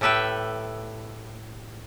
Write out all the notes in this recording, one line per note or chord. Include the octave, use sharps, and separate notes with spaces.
A2 G4 A4 B4 E5 G5